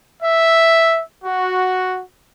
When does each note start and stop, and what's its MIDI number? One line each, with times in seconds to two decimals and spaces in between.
0.23 1.00 76
1.24 2.00 66